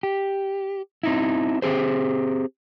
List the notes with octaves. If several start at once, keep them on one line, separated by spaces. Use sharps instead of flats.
G4
C4 D#4 E4
C4 G4 G#4 C5